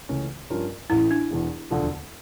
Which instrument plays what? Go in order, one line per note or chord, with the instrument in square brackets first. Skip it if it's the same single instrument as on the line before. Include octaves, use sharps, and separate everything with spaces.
[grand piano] C#2 C#3 E3 A3 C#4
G2 F3 C#4 F4 A#4
[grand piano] A1 A2 E3 [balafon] E4
[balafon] D4
[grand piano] E1 E2 E3
E1 D2 D3 F3